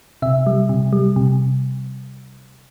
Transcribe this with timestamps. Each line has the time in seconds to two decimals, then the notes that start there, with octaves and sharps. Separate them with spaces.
0.22 C3 E5
0.47 G3
0.69 C3
0.93 G3
1.16 C3